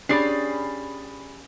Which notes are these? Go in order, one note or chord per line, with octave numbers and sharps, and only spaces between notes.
C#4 D4 G4 G#4 D5 B5 A6 C7